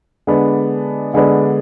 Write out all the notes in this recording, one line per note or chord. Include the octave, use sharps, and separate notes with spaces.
D3 G#3 B3 D4
D3 G#3 B3 D4